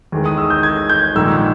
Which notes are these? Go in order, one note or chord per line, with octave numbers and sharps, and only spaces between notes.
E2 D#3 G#3
D#6
E6
G6
G#6
G6
A#1 G#2 D#3 G#3 E6